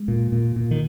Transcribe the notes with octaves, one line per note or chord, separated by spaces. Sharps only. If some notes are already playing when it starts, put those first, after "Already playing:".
Already playing: G#3
A#2
A#2
A#2
D#3